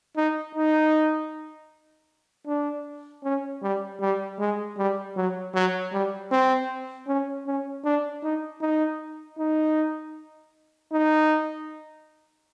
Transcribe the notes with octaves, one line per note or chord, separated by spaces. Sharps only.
D#4
D#4
D4
C#4
G3
G3
G#3
G3
F#3
F#3
G3
C4
C#4
C#4
D4
D#4
D#4
D#4
D#4